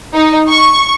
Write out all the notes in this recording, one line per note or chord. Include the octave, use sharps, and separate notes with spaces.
D#4
C#6